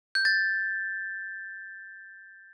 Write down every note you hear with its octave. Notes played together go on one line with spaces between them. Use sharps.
G6
A6